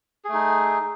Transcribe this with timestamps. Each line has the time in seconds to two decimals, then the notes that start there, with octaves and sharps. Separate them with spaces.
0.25 G#4
0.29 A3
0.34 D#4